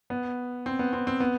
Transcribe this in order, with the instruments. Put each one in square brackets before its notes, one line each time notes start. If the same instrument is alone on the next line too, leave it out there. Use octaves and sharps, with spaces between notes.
[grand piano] B3
C4
B3
C4
C4
B3